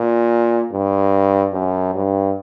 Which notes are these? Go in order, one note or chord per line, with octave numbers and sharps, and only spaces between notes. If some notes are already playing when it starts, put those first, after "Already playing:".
Already playing: A#2
G2
F#2
G2